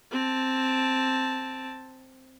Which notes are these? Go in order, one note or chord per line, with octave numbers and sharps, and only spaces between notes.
C4 A5